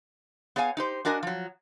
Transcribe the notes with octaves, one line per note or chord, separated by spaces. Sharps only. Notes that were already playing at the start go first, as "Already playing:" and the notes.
B3 G#4 C#5 F5 G#5
D#4 G4 C5
D4 F#4 A#4 D#5 G#5
F3 F#3